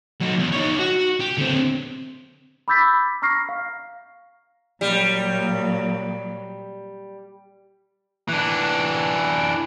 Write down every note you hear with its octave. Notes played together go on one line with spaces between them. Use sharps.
F#3 D#4
E2
D#4 C#5
F#4
G4
D3 C4
B5 D6 E6 G6 A6 B6
A#5 C#6 F6 A#6 C7
F5
A#2 F#3 G3
E3 D4